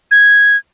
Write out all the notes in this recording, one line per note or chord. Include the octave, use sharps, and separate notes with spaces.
G#6